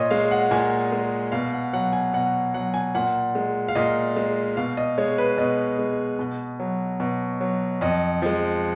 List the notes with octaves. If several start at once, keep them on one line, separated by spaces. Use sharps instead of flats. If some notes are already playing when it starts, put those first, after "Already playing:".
Already playing: A#2 C#5 D#5
G#3 F5
F#5
A#2 G#5
G#3
B2 F5
F#5
F#3 F#5
G#5
B2 F#5
F#3 F#5
G#5
A#2 F#5
G#3
F5
A#2 D#5
G#3
B2 F5
D#5
G#3 C#5
B4
B2 D#5
G#3
B2
F#3
B2
F#3
F2 D#5
F3 G#3